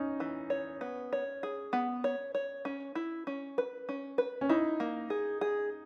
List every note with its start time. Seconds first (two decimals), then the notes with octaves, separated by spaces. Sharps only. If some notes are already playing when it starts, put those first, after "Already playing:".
Already playing: C#4 D#4
0.20 E3
0.50 C#5
0.81 B3
1.13 C#5
1.43 G#4
1.73 B3
2.04 C#5
2.35 C#5
2.65 C#4
2.95 E4
3.27 C#4
3.58 B4
3.89 C#4
4.18 B4
4.41 C#4
4.49 D#4 E4
4.80 A#3
5.10 G#4
5.41 G#4